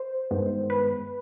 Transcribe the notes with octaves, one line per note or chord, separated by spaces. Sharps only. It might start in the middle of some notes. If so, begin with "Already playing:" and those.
Already playing: C5
G2 D#3 G#3 B3
B4